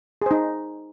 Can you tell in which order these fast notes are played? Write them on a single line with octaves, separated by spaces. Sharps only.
G#4 C5 D#4